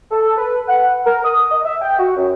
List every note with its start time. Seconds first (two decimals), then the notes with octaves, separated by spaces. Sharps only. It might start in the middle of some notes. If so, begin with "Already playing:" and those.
0.11 A4
0.37 B4
0.68 F#5
1.06 A#4
1.24 D#6
1.51 D#5
1.65 E5
1.82 G5
1.99 F#4
2.16 F#2